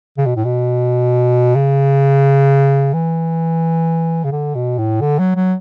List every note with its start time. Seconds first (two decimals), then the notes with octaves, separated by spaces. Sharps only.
0.18 C#3
0.26 B2
0.36 A2
0.45 B2
1.55 C#3
2.93 E3
4.24 C#3
4.32 D3
4.55 B2
4.78 A2
5.01 D3
5.19 F#3
5.36 F#3